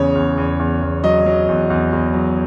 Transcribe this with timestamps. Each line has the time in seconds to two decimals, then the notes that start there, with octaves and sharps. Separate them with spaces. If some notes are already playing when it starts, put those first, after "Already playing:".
Already playing: E2 C#3 C#5
0.15 E2
0.37 E2
0.59 E2
0.82 E2
1.04 F#3 D#5
1.26 F#3
1.48 E2
1.70 E2
1.92 E2
2.14 F#3